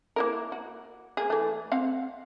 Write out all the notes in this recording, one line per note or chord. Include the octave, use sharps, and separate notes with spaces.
A#3 E4 A#4
F#4
A#3 G#4
E3 A3
C4 F5 F#5